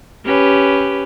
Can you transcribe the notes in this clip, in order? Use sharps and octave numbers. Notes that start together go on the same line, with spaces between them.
C#4 G4 B4